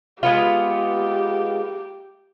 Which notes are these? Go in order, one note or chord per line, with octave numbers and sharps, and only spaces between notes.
G#3 B3 F4 G4